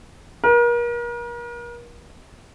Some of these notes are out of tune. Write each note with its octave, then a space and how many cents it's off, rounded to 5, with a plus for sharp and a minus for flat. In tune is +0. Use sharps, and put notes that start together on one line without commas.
A#4 +40